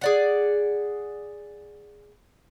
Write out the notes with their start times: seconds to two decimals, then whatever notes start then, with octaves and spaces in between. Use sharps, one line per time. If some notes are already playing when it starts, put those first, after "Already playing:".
0.01 G#4 D5 F#5